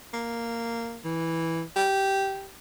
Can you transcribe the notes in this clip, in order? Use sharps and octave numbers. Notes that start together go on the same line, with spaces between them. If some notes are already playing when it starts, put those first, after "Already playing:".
A#3
E3
G4